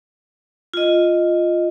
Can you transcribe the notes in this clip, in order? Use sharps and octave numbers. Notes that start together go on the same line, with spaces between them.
F4 D#5